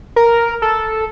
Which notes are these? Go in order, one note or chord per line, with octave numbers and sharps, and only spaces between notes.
A#4
A4